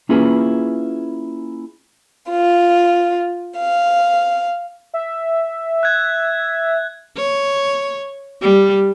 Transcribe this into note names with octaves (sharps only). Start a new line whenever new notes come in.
A#3 C#4 E4 F4 G#4 B4
F4
F5
E5
F#6 G#6
C#5
G3